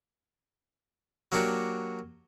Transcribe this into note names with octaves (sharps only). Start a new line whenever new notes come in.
F#3 A#3 D4 F#4 G4